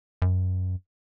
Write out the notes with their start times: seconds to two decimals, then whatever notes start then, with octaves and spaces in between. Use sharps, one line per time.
0.22 F#2